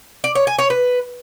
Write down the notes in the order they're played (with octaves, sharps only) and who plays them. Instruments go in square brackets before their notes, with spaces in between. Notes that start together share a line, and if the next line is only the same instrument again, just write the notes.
[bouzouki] D5
C#5
G#5
C#5
B4